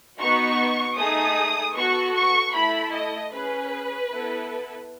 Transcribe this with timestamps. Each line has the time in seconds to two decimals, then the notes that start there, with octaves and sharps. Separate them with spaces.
0.20 B3 D#4 F#4 C#6
0.98 A3 D#4 G#4 D#6
1.76 B3 F#4 A4 C#6
2.16 C#6
2.54 A3 E4 A4 B5
2.94 D#5
3.32 C#4 G#4 B4
4.11 B3 E4 A4